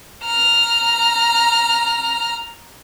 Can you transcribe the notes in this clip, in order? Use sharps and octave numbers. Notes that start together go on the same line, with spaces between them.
A#5 F6